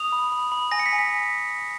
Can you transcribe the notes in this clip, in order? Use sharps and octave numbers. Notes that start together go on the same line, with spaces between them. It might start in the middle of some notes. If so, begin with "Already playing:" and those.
Already playing: D#6 F7
B5
B5
B5
G#5 A#6
C#7
B6
G#5
B6